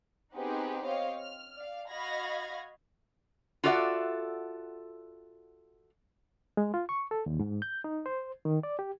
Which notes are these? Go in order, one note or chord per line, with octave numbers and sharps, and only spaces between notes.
B3 C4 D#4 G4 G#4 B4
C4 G4 C#5 D#5 F5
F6
D5 F5
F#4 D#5 F5 B5 G#6 A#6
F4 F#4 A4 D5 E5 F#5
G#3
F4
C#6
A4
D#2
G#2
G6
D#4
C5
D#3
D5
G4